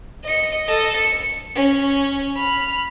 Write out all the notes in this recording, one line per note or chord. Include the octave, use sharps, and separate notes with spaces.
D#5 C#7
A4 D#5
C#7
C#4
B5 F6